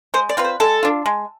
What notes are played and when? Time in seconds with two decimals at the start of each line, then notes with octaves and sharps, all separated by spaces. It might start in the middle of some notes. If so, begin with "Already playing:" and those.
0.14 G#3 C5
0.29 D5
0.37 C4 F4 B4
0.45 C5
0.60 G#3 A4
0.83 D4 F4
1.06 G#3